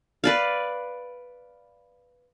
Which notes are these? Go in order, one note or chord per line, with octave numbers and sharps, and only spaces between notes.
B4 D5 F5